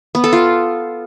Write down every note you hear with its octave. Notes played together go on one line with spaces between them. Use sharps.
B3
A4
F4